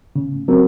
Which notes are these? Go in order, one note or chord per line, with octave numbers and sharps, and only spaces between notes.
C#3
F#3 C4 F#4 A#4